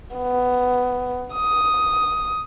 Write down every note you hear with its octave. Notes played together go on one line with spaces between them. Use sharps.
B3
D#6